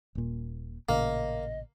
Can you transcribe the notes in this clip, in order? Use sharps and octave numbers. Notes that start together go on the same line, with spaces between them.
D#1 A#2
A1 A#2 C#3 A#3 D#5